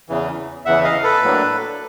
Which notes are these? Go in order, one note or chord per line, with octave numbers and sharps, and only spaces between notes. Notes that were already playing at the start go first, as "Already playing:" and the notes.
E2 C#3 E3
E2 C#3 E3 E5 F#5
D#5 F5
A4 B4
A2 F#3 A#3 D4